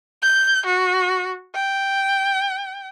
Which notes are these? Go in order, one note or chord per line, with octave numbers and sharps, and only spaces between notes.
G6
F#4
G5